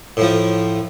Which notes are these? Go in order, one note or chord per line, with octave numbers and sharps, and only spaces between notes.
A2 F3